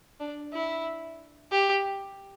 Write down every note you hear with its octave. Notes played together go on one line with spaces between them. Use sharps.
D4
E4
G4